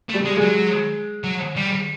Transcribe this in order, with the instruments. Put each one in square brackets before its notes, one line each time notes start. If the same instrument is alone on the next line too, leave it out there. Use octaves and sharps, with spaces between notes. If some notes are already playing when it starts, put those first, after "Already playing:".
[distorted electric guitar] A3
[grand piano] G3
[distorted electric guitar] G#3
[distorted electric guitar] F#3 [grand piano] G#3
[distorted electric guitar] F#3
G3